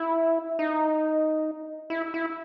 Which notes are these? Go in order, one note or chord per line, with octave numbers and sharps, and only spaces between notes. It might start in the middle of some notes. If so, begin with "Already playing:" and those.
Already playing: E4
D#4
E4
E4